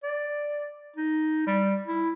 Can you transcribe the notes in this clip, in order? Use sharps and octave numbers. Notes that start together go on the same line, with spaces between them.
D5
D#4
G3
E4